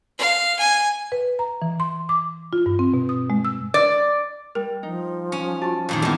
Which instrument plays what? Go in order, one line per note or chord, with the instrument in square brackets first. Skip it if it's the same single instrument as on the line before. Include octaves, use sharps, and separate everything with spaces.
[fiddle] F5
G#5
[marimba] B4
A#5
E3
C6
D6
F4
G2
C4
B2
D#6
G#3
E6
[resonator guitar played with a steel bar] D5
[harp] G3 [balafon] A#4
[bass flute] F3 [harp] D#4
[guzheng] C#4
[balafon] F4 F#4 [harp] A5
[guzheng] F2 A#2 D#3
[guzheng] E2 D#3 [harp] G2 B3